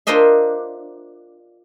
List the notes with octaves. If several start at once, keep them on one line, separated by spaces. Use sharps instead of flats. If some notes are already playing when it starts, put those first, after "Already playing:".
D4 F4 A#4 C5 D#5 E5